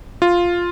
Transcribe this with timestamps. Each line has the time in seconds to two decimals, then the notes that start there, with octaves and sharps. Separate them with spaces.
0.22 F4